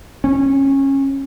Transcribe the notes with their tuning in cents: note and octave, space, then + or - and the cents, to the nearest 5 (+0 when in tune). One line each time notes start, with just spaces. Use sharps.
C#4 -20